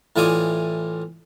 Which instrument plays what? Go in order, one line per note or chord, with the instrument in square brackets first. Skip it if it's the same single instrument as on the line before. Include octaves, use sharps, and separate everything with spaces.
[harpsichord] A2 E3 F4 D5 G#5 D#6